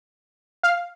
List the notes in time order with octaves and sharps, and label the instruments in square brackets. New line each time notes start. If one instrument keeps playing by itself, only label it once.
[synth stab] F5